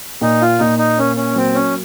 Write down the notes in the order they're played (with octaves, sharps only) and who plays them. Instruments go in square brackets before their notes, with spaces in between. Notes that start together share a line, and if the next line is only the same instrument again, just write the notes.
[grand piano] A#2 [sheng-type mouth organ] D#4
[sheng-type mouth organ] F4
[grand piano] A#2 [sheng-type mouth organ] D#4
[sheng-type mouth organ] D#4
[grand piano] A#3 [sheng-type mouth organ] C#4
[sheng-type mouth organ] C#4
[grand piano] F#3 [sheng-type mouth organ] C4
[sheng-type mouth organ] C#4